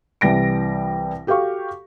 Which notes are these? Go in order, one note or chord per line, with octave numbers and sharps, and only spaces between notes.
C2 E3 G3 A#6 D7
F#4 G4 A4 F5 C#6